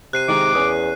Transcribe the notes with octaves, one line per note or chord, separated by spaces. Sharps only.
C3 F#6 C7 D#7
D#3 G#3 A#5 D6
E2 C#4 D#6